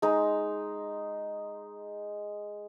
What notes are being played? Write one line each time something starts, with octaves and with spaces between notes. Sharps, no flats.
G#3 D#4